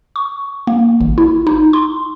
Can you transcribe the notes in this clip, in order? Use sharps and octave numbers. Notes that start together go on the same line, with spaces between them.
C#6
A#3
G#1
E4
D#4
C6